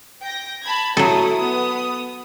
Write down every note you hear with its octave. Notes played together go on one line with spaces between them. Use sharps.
G5 A#6
A5 B5 G#6
F#3 A3 E4 A4 D#6
B3 D#6